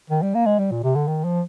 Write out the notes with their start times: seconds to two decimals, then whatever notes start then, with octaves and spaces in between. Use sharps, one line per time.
0.10 D#3
0.22 G3
0.34 A#3
0.46 G#3
0.59 G3
0.71 A#2
0.84 C3
0.96 D3
1.08 D#3
1.24 F3